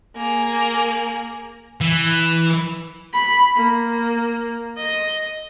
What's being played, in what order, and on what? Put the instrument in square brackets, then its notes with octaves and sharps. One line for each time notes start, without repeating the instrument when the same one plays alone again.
[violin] A#3 G#4
[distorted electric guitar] E3
[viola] B5
A#3
D#5